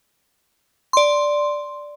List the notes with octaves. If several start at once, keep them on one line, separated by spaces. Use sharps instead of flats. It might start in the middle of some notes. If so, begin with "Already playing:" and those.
D5 C6